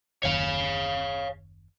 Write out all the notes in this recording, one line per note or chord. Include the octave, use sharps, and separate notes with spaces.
F#1 D#2 C#5 F5